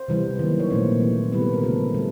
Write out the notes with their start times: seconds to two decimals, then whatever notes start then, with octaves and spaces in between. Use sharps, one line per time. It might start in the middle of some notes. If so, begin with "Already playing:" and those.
Already playing: C5
0.08 C3 E3 G3
0.39 D#3 F#3 A#3
0.60 C#5
0.70 A#2 F3 A3 C4 C5
1.00 E3 A3 C4
1.32 C3 E3 G3 B3 B4
1.42 A4
1.53 A#4
1.63 C#3 F3 A3 A4
1.94 D3 G3